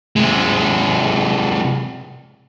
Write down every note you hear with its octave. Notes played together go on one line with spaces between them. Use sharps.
C3 G#3